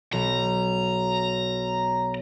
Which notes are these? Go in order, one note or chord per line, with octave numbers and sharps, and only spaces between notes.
B1 A#5